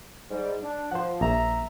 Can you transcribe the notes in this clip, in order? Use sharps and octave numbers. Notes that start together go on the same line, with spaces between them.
G#2 G3
D4
F3 C5 F#5
A#1 E5 A#5